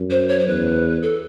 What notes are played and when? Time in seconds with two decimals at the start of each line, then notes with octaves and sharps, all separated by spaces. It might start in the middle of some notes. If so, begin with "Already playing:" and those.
Already playing: F#2
0.10 C5
0.28 C#5
0.39 C5
0.47 E2 B4
1.02 A4